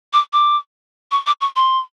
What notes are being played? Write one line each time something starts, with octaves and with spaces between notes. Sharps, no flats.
D6
D6
C#6
D6
C#6
C6